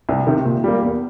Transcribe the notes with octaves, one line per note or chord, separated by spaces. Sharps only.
C2
C3 D#3
A#2
G3 A#3
E2